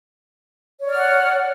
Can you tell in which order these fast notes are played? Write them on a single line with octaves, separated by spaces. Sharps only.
C#5 D5 F6 F#5